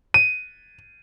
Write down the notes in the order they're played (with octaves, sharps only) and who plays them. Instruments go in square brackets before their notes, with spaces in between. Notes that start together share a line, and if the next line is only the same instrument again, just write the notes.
[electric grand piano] D#7